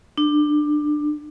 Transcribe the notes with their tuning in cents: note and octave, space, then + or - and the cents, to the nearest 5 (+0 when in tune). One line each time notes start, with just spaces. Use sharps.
D4 +20